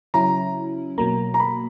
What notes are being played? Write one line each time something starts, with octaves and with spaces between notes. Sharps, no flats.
C#3 F#3 C#4 E4 A#5
B2 F#3 A#3 A#5
A#5
B5